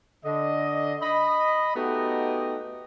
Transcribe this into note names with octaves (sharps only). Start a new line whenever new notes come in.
D3 D#5
D#5 B5
A3 B3 D#4 F#4 G4 D#5